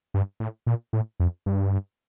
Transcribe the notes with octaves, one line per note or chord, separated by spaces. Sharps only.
G2
A2
A#2
A2
F2
G2